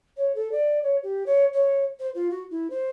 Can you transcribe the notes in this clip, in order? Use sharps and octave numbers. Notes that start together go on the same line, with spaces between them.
C#5
A4
D5
C#5
G4
C#5
C#5
C5
F4
F#4
E4
C5